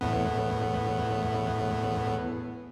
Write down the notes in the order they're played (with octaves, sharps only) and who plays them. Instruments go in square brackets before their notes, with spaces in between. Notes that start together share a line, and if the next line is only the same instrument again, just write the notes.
[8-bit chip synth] E2 A2 B3